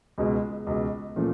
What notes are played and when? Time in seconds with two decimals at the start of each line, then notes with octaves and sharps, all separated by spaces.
0.18 C#2 B2 G#3
0.67 C#2 B2 G#3
1.16 A#2 F3 A3 C#4